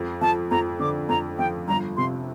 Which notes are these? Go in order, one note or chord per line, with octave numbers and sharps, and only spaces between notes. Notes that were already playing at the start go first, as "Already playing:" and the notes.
Already playing: F2
F3 A5
F2 A#5
D3 D6
F2 A#5
F3 G5
G1 A#5
C3 C6